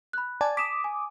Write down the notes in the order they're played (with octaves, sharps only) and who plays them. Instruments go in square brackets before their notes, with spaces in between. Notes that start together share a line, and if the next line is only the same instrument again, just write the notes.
[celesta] B5 F#6
[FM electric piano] D5 G#5 A5
[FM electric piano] D6 D#6 [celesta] B6 E7
[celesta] G#5